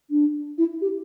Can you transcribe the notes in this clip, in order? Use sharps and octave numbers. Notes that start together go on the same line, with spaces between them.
D4
E4
G4